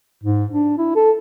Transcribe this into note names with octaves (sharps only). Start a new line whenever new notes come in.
G#2
D4
E4
A4